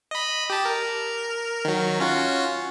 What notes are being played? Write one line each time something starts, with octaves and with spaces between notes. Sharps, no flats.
D#5 B5
G4 A5
A#4
D#3 F#3
C#4 F4 F#4